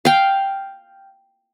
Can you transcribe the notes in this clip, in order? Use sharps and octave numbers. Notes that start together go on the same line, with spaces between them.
F5 G5